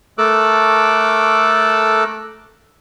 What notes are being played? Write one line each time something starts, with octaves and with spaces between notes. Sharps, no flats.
A3 A4 A#4 D6 E6 F#6